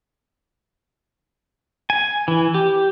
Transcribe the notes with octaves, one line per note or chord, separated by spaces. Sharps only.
G#5
E3
G4